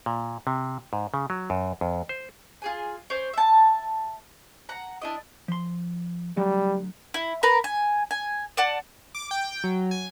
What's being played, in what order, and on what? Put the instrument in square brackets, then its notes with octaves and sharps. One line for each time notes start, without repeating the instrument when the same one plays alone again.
[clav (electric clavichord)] A#2
C3
G#2
C#3
F#3
F#2
F2
C5
[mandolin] F4 G#4 G#5
C#4 C5 D5
E5 A5
F#5 A#5
D4 E4 D#5
[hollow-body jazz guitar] F3 C6
[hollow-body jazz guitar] D3 F#3 A3 [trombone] G3
[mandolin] E4
A#4 B4 A#5 B5
G#5
G#5
D5 F#5 A5
[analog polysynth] D6
G5
F#3
G#5